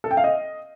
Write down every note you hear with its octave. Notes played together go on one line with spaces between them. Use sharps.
A4
G5
F5
D#5